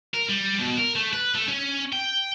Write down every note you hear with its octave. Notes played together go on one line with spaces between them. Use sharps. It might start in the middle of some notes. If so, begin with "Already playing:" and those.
A#4
G3
B2
A#4
A3
B4
A3
C#4
G5